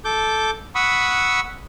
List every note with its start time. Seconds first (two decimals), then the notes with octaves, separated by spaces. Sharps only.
0.05 A4 D6 G6
0.75 F#5 B5 C#6 D#6 E6